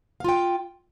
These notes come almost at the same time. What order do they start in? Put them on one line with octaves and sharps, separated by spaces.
F5 F4 G5